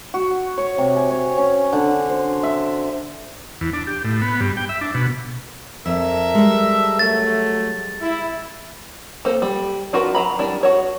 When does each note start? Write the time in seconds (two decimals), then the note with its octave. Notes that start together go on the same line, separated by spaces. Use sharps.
0.14 F#4
0.58 C#5
0.78 C3
0.96 G#5
1.11 C#5
1.38 C#4
1.73 D3
2.09 C5
2.43 E5
3.61 E2
3.73 D4
3.87 G4
4.04 A2
4.22 B3
4.41 G2
4.57 G5
4.69 E5
4.81 D4
4.94 B2
5.86 F2 A4 A#4 E5
6.35 G3 G#3
6.99 F#3 A3 A6
8.01 E4
9.25 A#3 A4 C5
9.42 G3
9.93 D4 F4 F#4 A#4 B4
10.15 F#3 A#5 B5
10.38 G3 D4 E4 A#4
10.63 F#4 C#5